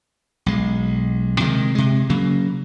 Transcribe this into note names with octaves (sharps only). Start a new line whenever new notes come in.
B1 G#3
C3 D#3 F3 G#3
C3 G#3
C#3 F#3 A#3